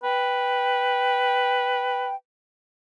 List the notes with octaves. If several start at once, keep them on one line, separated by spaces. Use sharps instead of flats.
B4 G5